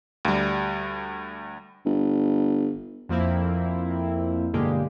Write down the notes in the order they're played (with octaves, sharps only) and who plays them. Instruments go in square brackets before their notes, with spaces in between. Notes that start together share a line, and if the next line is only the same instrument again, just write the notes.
[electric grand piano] D2 G3
[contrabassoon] G1
[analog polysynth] F2 F3 A#3 C4 E4
B1 G2 D3 G#3 A#3 G4